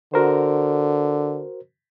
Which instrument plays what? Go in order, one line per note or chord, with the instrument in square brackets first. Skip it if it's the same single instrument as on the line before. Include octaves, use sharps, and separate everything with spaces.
[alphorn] D3 [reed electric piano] F#4 A#4 C5